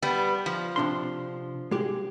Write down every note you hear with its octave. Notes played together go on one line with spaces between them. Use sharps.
G3 B3
F3
C3 D4 C6
G#3 G4 G#4